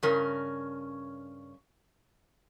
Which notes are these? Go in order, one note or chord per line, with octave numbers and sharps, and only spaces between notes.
G2 C#3 C#4 A#4